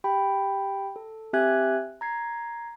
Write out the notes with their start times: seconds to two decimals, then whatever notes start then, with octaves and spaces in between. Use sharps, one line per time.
0.04 G4 G5 B5
0.96 A4
1.33 C4 G4 E5 G#5 F#6 G#6
2.01 A#5 G#6 C7